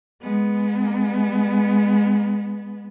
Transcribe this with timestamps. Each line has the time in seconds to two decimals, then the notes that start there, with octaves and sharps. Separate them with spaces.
0.22 G#3 B3